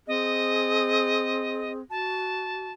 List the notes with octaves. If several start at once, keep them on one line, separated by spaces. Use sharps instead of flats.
C4 G#4 D#5
F#4 A5